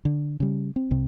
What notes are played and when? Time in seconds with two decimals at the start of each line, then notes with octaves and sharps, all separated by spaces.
0.05 D3
0.40 C#3 G3
0.76 C4
0.91 C2 C3